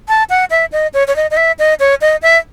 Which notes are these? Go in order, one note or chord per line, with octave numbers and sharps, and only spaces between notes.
A5
F#5
E5
D#5
C#5
C#5
D#5
D#5
E5
D#5
C#5
D#5
E5